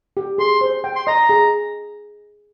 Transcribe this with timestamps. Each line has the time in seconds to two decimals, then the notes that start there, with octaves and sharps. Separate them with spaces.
0.17 G4
0.38 G#4 C6
0.61 C5
0.84 G5
0.96 C6
1.07 D#5 A#5
1.29 G#4